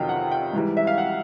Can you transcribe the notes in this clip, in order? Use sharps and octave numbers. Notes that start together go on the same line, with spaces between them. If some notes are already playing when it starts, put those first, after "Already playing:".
Already playing: F2 C3 D#3 F#3 F5 G5
F#5
G5
G#2 E3 G3
E5
F5
F#5